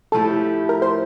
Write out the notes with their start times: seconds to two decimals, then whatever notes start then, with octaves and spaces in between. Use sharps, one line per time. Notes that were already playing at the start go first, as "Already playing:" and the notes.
0.12 A2 F3 A3 E4 G4 A4
0.69 A#4
0.82 C5